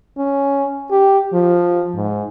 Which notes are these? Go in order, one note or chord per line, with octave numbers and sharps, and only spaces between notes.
C#4
G4
F3
G#2